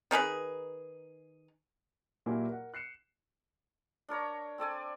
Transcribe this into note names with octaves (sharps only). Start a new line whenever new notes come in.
D#3 D#4 G#4 B4
A#2 F#3 A#3 E4 G4 G#5
A#4 F#5
F#6 C7 C#7 E7
D4 A#4 C#5 A#5
C4 A4 D5 G#5